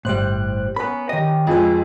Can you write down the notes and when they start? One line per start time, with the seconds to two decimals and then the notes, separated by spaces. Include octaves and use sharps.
0.05 G1 A2 G3 C5 F#6
0.76 B3 C#4 A#4 F#5 B5
1.09 D#3 G3 D#5
1.47 F2 F3 G#3 F4 G#4 B4 F5 G#5